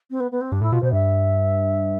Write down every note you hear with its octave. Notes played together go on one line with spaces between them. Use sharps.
C4
B3
B3
C4
G2 D4
A2 E4
B2 F4
B2 C5
G2 E5